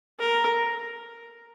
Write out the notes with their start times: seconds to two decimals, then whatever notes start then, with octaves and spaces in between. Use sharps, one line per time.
0.19 A#4